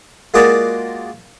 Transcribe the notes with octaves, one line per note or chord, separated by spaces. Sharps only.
G#3 A#3 F4 F#4 G#4 D5